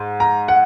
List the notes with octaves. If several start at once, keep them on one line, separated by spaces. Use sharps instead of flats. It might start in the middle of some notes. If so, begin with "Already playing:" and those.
Already playing: G#2
A#5
F#5